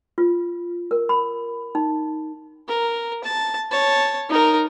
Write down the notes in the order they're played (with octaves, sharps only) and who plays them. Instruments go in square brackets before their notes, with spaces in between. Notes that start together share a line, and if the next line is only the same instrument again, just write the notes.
[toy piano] F4
A#4
B5
D#4
[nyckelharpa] A#4
A5
C#5 A5
D#4 A#4